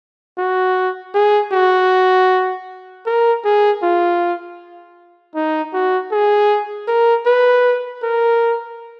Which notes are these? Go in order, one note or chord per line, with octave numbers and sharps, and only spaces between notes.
F#4
G#4
F#4
A#4
G#4
F4
D#4
F#4
G#4
A#4
B4
A#4